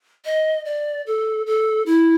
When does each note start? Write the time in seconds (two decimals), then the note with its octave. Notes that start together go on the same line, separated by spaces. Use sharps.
0.25 D#5
0.65 D5
1.07 A4
1.46 A4
1.86 E4